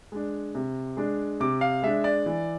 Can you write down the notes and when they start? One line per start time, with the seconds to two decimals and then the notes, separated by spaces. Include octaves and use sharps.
0.12 G#3 D4
0.55 C3
0.97 G#3 D4
1.40 C3 D6
1.61 F5
1.83 G#3 D4 E5
2.04 D5
2.26 E3